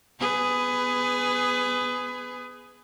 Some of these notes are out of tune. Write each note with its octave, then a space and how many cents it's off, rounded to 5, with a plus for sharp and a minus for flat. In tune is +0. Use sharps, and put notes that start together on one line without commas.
B3 +0 G#4 +0 B4 +25